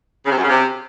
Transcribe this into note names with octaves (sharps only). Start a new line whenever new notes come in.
C#3
C3
F#2
C#3
C3